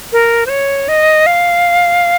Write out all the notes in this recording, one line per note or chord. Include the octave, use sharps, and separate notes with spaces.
A#4
C5
C#5
D#5
F5